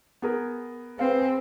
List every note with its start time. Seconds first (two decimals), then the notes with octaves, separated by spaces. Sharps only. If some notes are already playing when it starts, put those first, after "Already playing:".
0.22 B3 G#4 A#4
0.99 C4 G#4 B4 F5